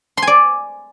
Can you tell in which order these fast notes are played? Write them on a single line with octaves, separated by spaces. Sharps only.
C6 G#5 D5